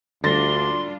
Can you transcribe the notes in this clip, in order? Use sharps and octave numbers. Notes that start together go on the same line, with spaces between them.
D2 D3 G3 D4 F4 C6 A6 A#6